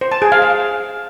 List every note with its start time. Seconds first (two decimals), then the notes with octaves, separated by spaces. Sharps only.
0.01 C5
0.12 A5
0.22 G#4
0.32 F5
0.42 F5